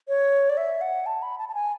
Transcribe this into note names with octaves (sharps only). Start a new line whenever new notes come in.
C#5
D5
E5
F#5
A5
B5
A5
A5
G#5